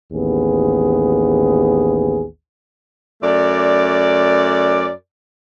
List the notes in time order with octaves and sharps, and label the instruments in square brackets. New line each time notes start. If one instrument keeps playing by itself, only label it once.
[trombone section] A1 D#2 B3 G#4
[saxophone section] F#2 A3 D5